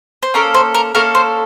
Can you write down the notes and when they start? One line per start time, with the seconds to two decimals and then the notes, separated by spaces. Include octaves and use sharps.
0.23 C5
0.34 A#3 C#4 A4 A#4
0.54 C5
0.74 A#4
0.95 A#3 C#4 A4 A#4
1.15 C5